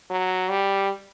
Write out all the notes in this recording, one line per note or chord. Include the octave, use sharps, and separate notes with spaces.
F#3
G3